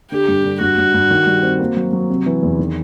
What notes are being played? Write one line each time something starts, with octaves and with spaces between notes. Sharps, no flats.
D3 G4
G2
D3
G2 F#4
G2
G2
D#3
G3
C4
A#3
F#3
F#3
C3
E3
E2
D#3